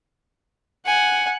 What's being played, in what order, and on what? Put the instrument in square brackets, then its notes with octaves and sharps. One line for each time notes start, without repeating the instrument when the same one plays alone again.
[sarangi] F#5 [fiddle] G#5